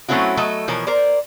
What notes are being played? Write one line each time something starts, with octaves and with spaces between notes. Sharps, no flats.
F#3 A3 C4 C#4 E4 F#4
F#3 A3 A4 D#5
B2 E3 F3 A#4 C#5
A#4 C5 D5